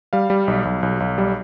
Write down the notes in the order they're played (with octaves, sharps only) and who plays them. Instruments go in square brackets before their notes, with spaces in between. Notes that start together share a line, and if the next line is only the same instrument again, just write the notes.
[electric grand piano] G3 F5
G3
B1
B1
B1
B1
G3